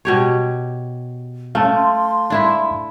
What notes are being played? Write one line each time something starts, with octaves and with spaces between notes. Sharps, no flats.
B2 G4 C#5
A3 C#4 F5 A5
C6
D4 E4 E5